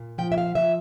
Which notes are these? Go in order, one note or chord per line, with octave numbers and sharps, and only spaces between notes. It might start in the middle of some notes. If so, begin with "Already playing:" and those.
Already playing: A#2
F3 G5
E5
F5
F3 E5